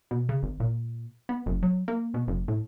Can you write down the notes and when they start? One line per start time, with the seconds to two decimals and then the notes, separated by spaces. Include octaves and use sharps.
0.11 B2
0.29 C#3
0.43 G#1
0.60 A#2
1.29 B3
1.46 F#1
1.63 F#3
1.88 A#3
2.14 B2
2.28 F#1
2.48 A2